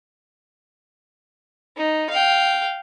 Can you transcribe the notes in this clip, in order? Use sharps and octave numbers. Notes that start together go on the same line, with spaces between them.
D#4
F5 G5